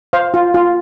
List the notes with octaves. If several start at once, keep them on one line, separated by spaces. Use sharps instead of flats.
C5 F5
F4
F4